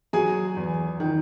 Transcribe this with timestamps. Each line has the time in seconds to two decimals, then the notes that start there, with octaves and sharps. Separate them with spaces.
0.13 F#3 G#4 G#5
0.56 E2
1.00 D#3